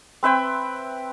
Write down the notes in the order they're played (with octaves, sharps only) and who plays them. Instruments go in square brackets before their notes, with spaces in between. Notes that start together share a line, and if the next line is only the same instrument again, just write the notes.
[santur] C4 B4 E5 G5